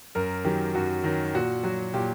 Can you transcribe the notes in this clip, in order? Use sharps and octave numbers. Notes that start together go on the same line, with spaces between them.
F#2 A#4
D#3 F#3 G4
F#2 F#4
D#3 F#3
A#2 F#4
F#3 F#4
A#2 G4